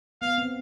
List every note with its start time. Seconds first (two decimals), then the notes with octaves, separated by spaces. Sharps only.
0.22 B3 F5
0.38 C4